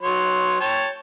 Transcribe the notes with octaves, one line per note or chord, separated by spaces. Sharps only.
F#3 C#5 C6
C#5 G5 A5